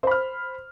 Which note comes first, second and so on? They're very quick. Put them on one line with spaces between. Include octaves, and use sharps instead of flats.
C5 B5 F6